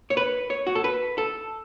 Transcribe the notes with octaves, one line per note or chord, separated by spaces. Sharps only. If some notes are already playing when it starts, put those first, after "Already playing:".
C#5
B4
C#5
F#4
A4
B4
A4